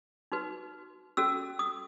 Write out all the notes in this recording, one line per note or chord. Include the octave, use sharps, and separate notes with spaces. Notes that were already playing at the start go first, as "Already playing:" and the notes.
D#4 F#4 B4
C#4 F#4 A4 E6
D#6